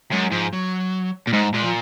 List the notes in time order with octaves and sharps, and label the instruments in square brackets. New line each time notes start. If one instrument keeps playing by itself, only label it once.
[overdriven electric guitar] F#2 [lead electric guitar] G#3
[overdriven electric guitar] G#2 [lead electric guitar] F3
[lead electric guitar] F#3
[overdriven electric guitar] A#2
[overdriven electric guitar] G#2 [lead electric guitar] G#3
[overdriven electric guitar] A#2 [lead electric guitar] G#3
[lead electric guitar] F3